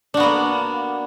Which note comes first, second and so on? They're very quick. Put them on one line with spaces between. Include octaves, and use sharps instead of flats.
D4 F#4 B3 A#3